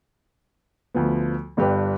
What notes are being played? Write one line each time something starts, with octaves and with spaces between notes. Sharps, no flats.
D2 F3 B3
G1 G2 G4 B4